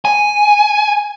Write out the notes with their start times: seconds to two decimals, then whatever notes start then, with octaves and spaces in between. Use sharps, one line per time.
0.05 G#5